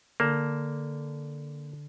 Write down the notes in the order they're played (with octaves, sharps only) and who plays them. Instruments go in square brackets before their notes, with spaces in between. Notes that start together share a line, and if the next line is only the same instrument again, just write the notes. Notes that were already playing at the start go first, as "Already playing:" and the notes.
[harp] D3 A4 [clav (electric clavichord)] A#3